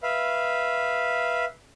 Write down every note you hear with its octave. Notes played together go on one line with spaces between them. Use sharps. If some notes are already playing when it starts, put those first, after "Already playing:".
B4 E5 F5